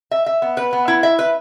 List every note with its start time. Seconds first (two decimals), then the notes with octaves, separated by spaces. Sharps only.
0.11 E5
0.26 E5
0.42 B3
0.57 B4
0.73 B3
0.88 E4
1.03 E5
1.19 B4